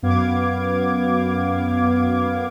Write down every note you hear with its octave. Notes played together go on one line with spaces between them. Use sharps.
F#2 B3 F5 D6 G#6